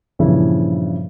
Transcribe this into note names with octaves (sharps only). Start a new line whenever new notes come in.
G2 A#2 C#3 E3 F3 E4